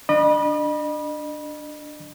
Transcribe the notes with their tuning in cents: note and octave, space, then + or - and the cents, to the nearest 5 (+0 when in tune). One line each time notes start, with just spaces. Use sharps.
D4 +0 D#5 -40 B5 -30